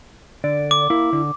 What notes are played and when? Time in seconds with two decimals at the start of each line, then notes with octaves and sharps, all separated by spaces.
0.44 D3 D5
0.71 D6
0.90 A#3 E4
1.13 D3